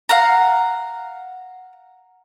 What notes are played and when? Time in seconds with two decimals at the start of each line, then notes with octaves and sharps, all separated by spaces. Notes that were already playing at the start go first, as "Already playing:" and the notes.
0.09 F5 F#5 A#5